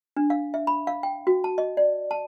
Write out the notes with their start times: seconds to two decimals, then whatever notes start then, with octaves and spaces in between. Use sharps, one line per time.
0.17 D4
0.30 F5
0.54 E5
0.67 B5
0.87 F5
1.03 G5
1.27 F#4
1.44 A5
1.58 D#5
1.77 D5
2.11 A5